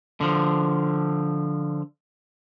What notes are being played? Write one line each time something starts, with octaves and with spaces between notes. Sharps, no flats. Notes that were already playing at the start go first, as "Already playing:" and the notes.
D3 F3